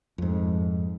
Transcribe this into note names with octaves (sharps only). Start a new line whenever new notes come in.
F2 G#2